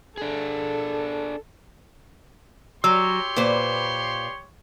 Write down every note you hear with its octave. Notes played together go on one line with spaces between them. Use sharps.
D4 G#4 A4
F#3 G4 C#5 C6 E6
A#2 B4 C5